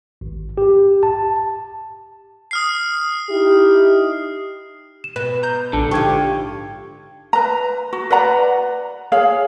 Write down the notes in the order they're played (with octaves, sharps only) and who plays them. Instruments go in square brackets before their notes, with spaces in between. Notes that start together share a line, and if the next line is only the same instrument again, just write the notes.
[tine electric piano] G#1
G4
A5
[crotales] D#6 F6 C7
[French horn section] D#4 E4 G4
[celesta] E7
[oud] B2 [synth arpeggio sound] B4
[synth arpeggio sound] A#5 G6
[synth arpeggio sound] A#1 [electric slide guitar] D3 [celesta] A5
[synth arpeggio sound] G#2 [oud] F4 G4 [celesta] C#6 G#6
[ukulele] B4 A#5
F#4
B4 D5 F#5 A#5
G#4 C#5 F5